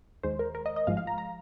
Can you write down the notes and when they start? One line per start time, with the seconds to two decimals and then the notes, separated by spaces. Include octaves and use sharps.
0.23 D#2 D#3 G#3 C5
0.39 A#4
0.55 A#4
0.66 D#5
0.76 D#5
0.87 G#1 G#2 F3 G#3 F5
0.97 F5
1.07 A#5
1.18 A#5